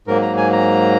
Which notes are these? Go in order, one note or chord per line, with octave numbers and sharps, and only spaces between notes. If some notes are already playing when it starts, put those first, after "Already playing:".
G#2 F#3 A#3 A#4
A#5
G#5
A#5